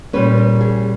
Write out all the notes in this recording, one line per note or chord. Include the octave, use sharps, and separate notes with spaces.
A#2 G3 C#4 B4
A#4
G#4